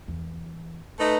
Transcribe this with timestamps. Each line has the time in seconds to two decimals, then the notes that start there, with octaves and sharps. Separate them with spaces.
0.08 E2
1.00 A3 D#4 B4